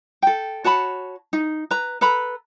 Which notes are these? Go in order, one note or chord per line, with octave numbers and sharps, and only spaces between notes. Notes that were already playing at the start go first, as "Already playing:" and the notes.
A4 G5
F#4 C#5 A5 B5
D#4
B4 A#5
A4 B4 A#5 B5